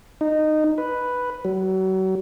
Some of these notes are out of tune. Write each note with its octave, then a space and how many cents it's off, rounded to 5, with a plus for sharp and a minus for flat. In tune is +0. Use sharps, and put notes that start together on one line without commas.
D#4 -15
B4 +0
F#3 +35